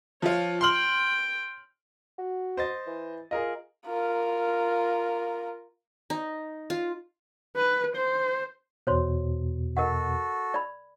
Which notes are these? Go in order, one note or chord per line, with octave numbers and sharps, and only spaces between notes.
F3 F4 C#5
G5 C6 F6 F#7
F#4
C5 D#5 A6
E3
F4 G#4 A#4 D#5
F4 A#4
D#4
F4
B4
C5
E2 B2 C5 C#5 C6
F#4 A4 A#4 D#5 F#5
D5 B5